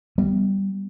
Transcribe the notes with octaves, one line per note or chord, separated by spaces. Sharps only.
G3 B3